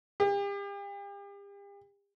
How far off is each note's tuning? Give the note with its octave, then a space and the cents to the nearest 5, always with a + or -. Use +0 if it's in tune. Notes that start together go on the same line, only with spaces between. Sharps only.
G4 +40